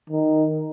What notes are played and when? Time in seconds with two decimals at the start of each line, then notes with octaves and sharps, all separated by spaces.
0.10 D#3